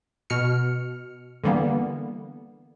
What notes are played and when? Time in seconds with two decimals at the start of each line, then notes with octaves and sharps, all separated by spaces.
0.30 B2 F6 C#7
1.44 D3 E3 G3 A#3 B3